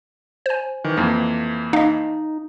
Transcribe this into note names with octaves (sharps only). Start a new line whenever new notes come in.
C5 G#5
D#3 E3
F2 E3 A#3
D#4 D#5 F5